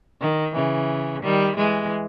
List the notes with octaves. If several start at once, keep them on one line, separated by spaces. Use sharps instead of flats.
D#3
C#3 E3
D#3 G3
E3 G#3